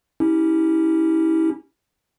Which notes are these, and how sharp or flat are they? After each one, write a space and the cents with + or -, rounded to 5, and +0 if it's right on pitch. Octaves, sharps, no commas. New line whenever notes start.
C#4 +0 E4 -30 G4 +0